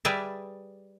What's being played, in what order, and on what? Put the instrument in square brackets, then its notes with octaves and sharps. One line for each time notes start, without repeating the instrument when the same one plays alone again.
[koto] G3 G#4 B4 D5 E5